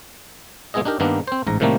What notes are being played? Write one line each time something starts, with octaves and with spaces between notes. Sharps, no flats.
G#3 B3 E4 G#4 D#5
D4 D#4 G4 A#4
G2 D#3 A#3 B3 D4
C4 C5
A1 G#2 A#5
A2 C3 D#3 G3 A3 A#3